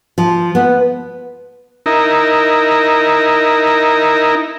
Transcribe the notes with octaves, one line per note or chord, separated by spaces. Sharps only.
F3
B3
D#4 E4 A#4